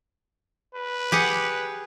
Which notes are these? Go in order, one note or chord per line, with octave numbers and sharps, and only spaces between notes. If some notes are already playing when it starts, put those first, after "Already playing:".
B4
G4 G#4 F#5